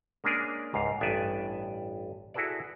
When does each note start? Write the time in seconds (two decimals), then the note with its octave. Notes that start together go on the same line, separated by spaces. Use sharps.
0.24 G#3 A#3 C#4 D4 G#4 A#4
0.74 C#2 G#2 F5
1.01 A1 G2 B3 D5 E5 G#5
2.34 E4 F#4 G#4 A4 B4 D5